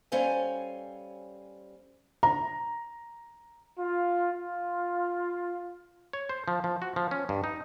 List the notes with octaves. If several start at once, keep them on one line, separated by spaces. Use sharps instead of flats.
G3 C#4 A4 C5 F5 G#5
A#5
F4
F4
C#5
C5
F3
F3
F#4
F3
C#4
G2
D#4